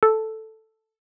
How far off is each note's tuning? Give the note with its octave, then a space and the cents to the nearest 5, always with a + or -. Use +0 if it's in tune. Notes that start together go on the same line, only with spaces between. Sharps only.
A4 +0